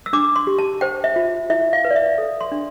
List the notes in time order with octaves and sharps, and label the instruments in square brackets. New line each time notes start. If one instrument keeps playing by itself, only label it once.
[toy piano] E6
D4 D6
C6
G4
A5
C5 G5
E5
F4
E4 E5
F5
B4
D5
E5
A4
C6
D4